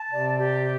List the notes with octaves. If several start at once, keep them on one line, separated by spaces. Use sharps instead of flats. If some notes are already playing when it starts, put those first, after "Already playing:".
Already playing: A5
C3 D5
G4